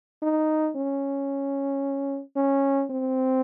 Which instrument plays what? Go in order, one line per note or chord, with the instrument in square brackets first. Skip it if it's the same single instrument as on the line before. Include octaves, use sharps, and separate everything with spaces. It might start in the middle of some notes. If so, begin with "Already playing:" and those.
[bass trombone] D#4
C#4
C#4
C4